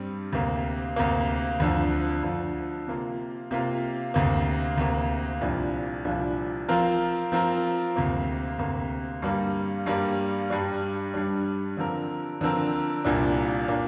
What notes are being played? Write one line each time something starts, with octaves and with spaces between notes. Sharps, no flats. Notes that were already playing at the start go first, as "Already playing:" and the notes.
Already playing: G2 G3 C4
D2 C3 A#3
D2 C3 A#3
D2 D3 F3
D2 D3 F3
C3 A#3 F4
C3 A#3 F4
D2 C3 A#3
D2 C3 A#3
C2 A#2 F3 D4
C2 A#2 F3 D4
F3 C4 F4 A#4
F3 C4 F4 A#4
D2 C3 A#3
D2 C3 A#3
G2 G3 A#3
G2 G3 A#3
G2 G3 D4
G2 G3 D4
D3 F3 C4 A#4
D3 F3 C4 A#4
C2 A#2 A#3 D4
A#2 A#3 D4